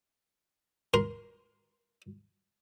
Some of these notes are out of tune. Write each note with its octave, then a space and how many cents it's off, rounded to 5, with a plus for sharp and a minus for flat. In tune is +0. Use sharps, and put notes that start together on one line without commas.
A#4 +20 C6 -10